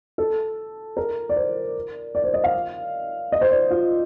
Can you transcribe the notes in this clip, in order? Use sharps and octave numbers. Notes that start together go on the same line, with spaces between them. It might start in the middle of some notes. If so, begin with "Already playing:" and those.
A4
A#4
D5
C5
D5
C5
D#5
F5
D#5
C5
D5
F4